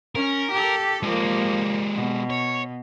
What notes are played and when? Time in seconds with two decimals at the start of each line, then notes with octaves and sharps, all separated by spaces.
0.15 C#4 A#4
0.51 G4 A4
1.03 F3 G#3 A#3 G4
1.96 B2
2.30 C#5